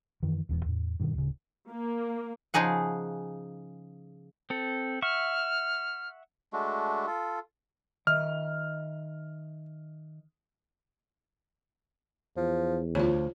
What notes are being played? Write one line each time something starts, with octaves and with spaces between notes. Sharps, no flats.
F#2 D#3 E3
D#1 E2 A2 B3
E2 A2
G2 B2 D3 D#3
D1 C#3
A#3
C#3 F3 D#4 G#4 F#5
C4 A4
E5 F#5 C#6 F6
G#3 A3 D4 F#4
F4 A4
D#3 D#5 E5 F6
E2 F3
D2 F3 F4 C#5